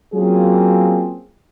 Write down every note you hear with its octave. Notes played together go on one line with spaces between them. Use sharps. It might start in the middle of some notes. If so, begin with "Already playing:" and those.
F#3 A#3 C4 C#4 F4 G#4